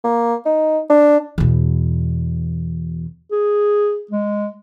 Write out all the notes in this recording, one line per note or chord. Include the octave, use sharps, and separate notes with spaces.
A#3
D#4
D4
E2 B2
G#4
G#3